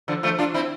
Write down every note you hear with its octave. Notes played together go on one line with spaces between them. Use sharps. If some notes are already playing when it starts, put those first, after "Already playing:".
D3 F3
F3 A3
D4 F4
C4 E4